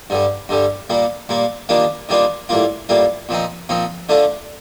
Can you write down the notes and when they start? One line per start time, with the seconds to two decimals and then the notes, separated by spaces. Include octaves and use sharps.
0.10 G2 D3 G3
0.49 G2 D3 G3
0.90 A#2 G3 A#3
1.29 A#2 G3 A#3
1.69 D#3 G3 A#3 D4 F4
2.09 D#3 G3 A#3 D4 F4
2.49 A2 G3 A#3 F4
2.89 A2 G3 A#3 F4
3.29 A#2 F3 C4 D#4
3.69 A#2 F3 C4 D#4
4.09 D3 A3 D4 F4